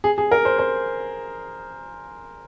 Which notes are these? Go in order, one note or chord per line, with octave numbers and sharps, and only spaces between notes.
G#4
G#4
A#4
C5
C5